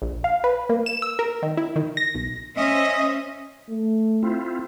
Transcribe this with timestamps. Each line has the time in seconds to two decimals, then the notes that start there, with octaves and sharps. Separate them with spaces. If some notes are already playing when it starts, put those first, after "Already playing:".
0.02 A#1
0.24 F5
0.44 B4
0.69 A#3
0.86 E7
1.02 E6
1.19 A#4
1.42 D#3
1.57 E4
1.76 D#3
1.97 A#6
2.15 B1
2.56 C#4 C5 D#5 E5
3.69 A3
4.23 C4 E4 F4